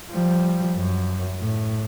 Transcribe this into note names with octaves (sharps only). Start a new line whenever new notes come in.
F3 G3
F#2
A2